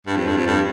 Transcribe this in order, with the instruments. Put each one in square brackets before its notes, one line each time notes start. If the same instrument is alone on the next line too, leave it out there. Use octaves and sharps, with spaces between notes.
[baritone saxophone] G2
F2
G2
F2
G2